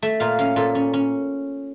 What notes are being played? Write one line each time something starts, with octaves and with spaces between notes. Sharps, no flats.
A3 E5
A#2 F5
C#4 F5
A#2 A4
C#4
C#4